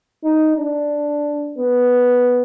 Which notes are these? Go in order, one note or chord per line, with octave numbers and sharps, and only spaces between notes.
D#4
D4
B3